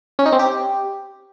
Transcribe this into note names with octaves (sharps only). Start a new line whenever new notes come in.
C#4
D#4
C4
G4